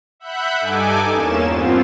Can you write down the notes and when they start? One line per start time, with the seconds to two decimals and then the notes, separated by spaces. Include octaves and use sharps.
0.20 E5 F#5 B5 F#6 G6
0.58 G2 D#4 A4 G#5 D6
1.11 E2 A#3 C#4 E7
1.43 G2 B3 C4 F4